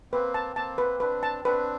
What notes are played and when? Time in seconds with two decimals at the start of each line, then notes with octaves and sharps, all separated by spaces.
0.12 A#3 C4 B4
0.34 A5
0.56 A#3 C4 A5
0.78 B4
1.00 C4 D4 B4
1.23 A5
1.45 C4 D4 B4